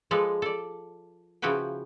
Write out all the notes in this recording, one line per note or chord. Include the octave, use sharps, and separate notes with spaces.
F3 G#3 A4 B4 D5
A4 D5
C#3 F3 E4 F#4 B4 G5